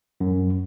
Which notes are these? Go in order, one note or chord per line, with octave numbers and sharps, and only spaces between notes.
F#2